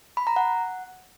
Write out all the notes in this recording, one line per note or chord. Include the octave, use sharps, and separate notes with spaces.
B5
A#5
F#5